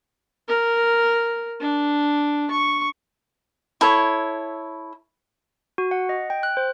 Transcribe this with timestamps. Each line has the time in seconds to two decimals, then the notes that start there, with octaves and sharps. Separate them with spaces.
0.48 A#4
1.60 D4
2.50 C#6
3.81 E4 A4 C#5
5.78 F#4
5.91 F#5
6.09 D#5
6.30 G5
6.43 F#6
6.57 C5